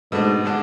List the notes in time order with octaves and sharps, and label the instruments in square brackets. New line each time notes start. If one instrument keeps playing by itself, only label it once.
[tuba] G#2 [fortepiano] B2 A3 D4
[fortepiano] D3 G#3 D4